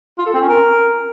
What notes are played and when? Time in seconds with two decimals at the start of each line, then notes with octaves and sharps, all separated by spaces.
0.18 F4
0.26 A4
0.34 C4
0.41 C#4
0.49 A#4